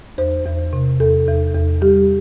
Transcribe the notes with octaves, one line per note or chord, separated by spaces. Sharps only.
E2 C5
E2
C3
E2 A4
E2
E2
G3 G4